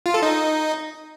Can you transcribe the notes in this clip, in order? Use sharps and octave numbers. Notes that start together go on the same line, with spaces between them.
F4
A4
D#4